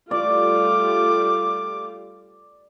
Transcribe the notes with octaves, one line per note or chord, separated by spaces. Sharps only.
G3 A3 F4 D5 D6